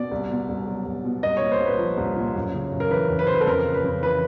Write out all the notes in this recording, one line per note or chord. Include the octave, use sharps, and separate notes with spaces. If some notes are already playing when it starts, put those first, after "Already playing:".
Already playing: B2 D5
C2
B2
C2
F#3
C2
B2
C2 D#5
A#2 C#5
C5
C2
B4
F3
C2
A#2
F#2
C#3
F#2
A#4
E3 B4
F#2
B4
C#3 C5
B4
A4
F2 A#4
C#3
B4
F2
E3 B4